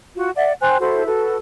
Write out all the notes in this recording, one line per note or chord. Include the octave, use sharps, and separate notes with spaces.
F4 F#4
D5 E5 F#5
C5 G5 G#5 F#6
E4 F#4 A4 C5
F#4 A4 B4